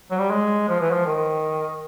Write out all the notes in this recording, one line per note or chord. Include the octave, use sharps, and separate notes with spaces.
F#3
G3
G#3
F3
E3
F3
D#3